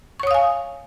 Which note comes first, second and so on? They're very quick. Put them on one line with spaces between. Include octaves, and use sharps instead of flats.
C#6 C#5 D#6 F5 G#5